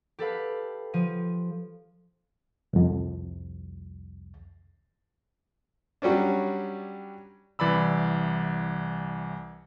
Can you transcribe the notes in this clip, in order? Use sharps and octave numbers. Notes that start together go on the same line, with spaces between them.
G4 A4 B4 F5
F3 D#7
C2 F2
F#3 G3 C#4 D4
C2 E3 D5 B5 E6